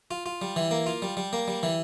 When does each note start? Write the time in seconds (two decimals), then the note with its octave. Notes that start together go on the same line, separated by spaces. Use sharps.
0.11 F4
0.26 F4
0.42 G3
0.56 E3
0.71 A#3
0.87 F4
1.02 G3
1.17 G3
1.33 A#3
1.48 G3
1.63 E3